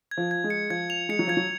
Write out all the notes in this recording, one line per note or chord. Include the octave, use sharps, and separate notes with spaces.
G#6
F3
G#6
G#3
C#7
F3 G#6
F7
G#3 C#7
F#3
F3 G#6
F#3